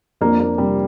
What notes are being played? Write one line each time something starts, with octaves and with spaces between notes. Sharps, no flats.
F2 A#3 D4
A#3
C3 G3